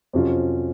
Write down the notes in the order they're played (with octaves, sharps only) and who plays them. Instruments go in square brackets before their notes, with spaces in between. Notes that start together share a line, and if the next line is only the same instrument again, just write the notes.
[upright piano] F2 C3 F#3 C#4 F4